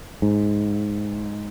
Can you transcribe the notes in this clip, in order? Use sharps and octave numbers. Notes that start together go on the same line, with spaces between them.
G#2